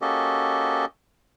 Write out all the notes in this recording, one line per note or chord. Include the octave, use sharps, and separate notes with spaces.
A#3 C#4 F#4 G4 A4 D#5